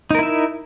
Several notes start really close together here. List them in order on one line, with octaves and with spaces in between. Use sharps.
D#4 A#4 E4 E5